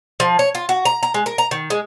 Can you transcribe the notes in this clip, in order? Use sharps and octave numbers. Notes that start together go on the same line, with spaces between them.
F3
C#5
F4
F#4
A#5
A#5
G#3
A#4
A#5
D#3
G#3